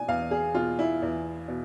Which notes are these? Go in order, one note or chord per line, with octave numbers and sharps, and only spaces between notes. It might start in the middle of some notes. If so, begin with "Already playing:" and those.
Already playing: B2 G#5
E2 F5
G#4
B2 F4
E4
E2
B2